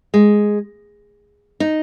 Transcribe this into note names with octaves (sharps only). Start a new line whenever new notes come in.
G#3
D#4